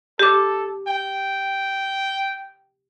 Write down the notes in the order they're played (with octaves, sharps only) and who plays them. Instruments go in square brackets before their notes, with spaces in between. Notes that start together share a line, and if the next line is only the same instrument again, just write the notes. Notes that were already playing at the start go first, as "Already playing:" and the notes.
[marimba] G4 D6 [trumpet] A4
[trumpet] G5